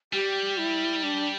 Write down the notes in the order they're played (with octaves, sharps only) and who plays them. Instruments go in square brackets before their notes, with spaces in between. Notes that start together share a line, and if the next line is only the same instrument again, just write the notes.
[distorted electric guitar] G3 [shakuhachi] G4
[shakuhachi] E4
D4